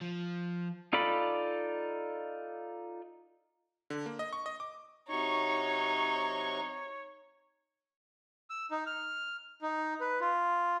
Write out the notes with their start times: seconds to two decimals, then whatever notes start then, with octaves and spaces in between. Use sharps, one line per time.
0.02 F3
0.93 D#4 F4 A4 D5 B5
3.90 D3
4.06 A#3
4.19 D#5
4.33 C#6
4.46 D#5
4.60 D6
5.09 C3 F#3 D#4 C#5 C#6
8.50 E6
8.71 D#4
8.87 F6
9.62 D#4
10.01 B4
10.21 F4